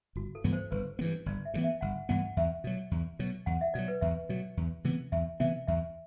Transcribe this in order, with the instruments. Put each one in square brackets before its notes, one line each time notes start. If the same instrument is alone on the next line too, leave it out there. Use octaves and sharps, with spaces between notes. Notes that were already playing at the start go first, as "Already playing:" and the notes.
[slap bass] G1 [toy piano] F#4
[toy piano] A4
[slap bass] G2 E3 B3
[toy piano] C5
[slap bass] G1 [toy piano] B4
[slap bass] G2 E3 B3
[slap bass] G1 [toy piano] D5
[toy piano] E5
[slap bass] G2 E3 B3
[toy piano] E5
[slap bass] G1 [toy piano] F#5
[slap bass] G2 E3 B3 [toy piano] F#5
[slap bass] E2 [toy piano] E5
[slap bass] B2 F#3
E2
B2 F#3
[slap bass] E2 [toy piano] F#5
[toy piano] E5
[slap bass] B2 F#3 [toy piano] D5
[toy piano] B4
[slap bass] E2 [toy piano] E5
[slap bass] B2 F#3
E2
C3 E3 B3
[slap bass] E2 [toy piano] E5
[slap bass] C3 E3 B3 [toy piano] E5
[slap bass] E2 [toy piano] E5